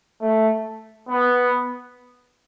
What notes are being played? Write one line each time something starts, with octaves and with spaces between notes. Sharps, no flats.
A3
B3